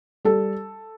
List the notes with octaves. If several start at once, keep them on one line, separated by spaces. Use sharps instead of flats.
G3 A4